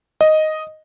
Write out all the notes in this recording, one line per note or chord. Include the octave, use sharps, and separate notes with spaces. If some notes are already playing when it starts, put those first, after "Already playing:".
D#5